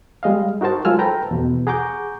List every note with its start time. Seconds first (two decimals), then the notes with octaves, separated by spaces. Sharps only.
0.23 G3 G#3 D#5 F5
0.61 D#4 F#4 A#4 C5 A5
0.85 F#3 G#3 F4 G#5 E6 F6
0.99 A4 B4 C5 G5 A5 A#5
1.31 E2 B2
1.67 G#4 F#5 A#5 C#6 D6 G6